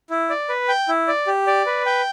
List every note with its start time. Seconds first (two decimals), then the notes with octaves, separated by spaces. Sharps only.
0.10 E4
0.30 D5
0.49 B4
0.68 G5
0.88 E4
1.08 D5
1.27 G4
1.47 D5
1.66 B4
1.86 G5